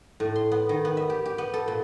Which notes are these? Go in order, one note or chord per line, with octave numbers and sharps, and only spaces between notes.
A2
C6
B3
D#3
B3
E5
G4
G4
B3
A4
A#2